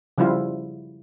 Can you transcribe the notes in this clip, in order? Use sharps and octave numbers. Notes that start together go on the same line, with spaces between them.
C#3 F3 G3 E4 F4